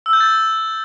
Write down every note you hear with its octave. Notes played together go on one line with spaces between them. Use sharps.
E6
G6
A6